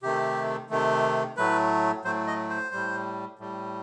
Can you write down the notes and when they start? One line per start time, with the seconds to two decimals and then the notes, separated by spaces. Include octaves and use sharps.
0.03 C3 D#3 A3 G4
0.70 C3 D#3 A3
1.37 A2 F#3 A3 B4
2.04 A2 F#3 A3 C5
2.27 D#5
2.49 C5
2.72 A2 G3
3.39 A2 G3